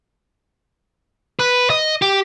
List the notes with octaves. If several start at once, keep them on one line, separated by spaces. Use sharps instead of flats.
B4
D#5
G4